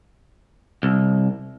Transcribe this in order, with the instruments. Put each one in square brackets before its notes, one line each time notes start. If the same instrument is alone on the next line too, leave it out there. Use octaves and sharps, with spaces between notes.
[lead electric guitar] C2